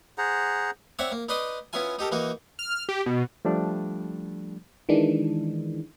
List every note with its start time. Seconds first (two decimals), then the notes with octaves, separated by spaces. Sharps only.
0.18 G#4 C5 F#5 A#5
0.99 C4 C#5 D5 E5 F#5
1.12 A#3
1.29 D#4 B4 D5 C6 D6 D#6
1.73 B3 C#4 E4 F4 G#5
1.99 D#4 G4 A4 A#4
2.11 E3 A#3 D#4 F#4
2.59 F6
2.89 G4
3.06 B2
3.45 F3 G3 A3 D4
4.89 D#3 E3 G#3 D4